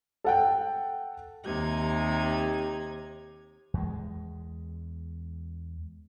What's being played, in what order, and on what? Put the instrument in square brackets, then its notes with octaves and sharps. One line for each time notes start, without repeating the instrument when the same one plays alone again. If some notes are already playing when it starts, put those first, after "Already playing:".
[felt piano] A4 F#5 G5
[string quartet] D#2 C3 D#4 G#6
[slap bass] E2 G#3